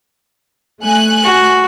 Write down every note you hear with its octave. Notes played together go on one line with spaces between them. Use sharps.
A3 G#5 F#6
F#4